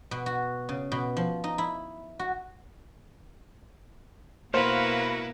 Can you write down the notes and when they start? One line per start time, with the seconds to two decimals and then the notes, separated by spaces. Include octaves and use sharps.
0.11 B2
0.26 F#4
0.69 C#3
0.92 B2
1.17 F3
1.44 D#4
1.58 E4
2.19 F#4
4.54 B2 A#3 E4 F#4 B4 C5 F5